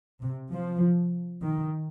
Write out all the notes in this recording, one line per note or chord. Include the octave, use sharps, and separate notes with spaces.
C3
F3
D#3